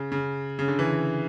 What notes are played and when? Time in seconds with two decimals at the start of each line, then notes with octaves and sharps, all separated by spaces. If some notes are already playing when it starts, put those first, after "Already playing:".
Already playing: C#3
0.12 C#3
0.59 C#3
0.68 D3
0.79 E3